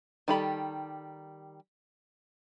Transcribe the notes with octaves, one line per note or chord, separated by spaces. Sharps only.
D#3 G3 G4 A4 B5